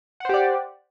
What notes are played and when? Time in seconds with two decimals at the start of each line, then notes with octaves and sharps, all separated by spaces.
0.20 F#5
0.25 C5
0.29 G4
0.34 D5